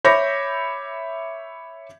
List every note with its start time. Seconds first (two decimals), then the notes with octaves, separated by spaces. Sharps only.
0.05 C#5 E5 B5 D6 G6 A#6